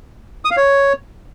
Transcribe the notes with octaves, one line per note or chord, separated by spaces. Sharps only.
D#6
F5
C#5